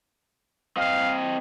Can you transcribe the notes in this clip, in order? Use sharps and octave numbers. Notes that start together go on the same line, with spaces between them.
C4 D#5 F5